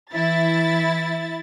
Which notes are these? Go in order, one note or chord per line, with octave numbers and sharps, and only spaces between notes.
E3 E4 A6